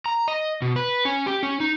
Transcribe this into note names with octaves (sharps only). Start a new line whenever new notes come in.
A#5
D#5
B2
B4
C#4
G4
C#4
D#4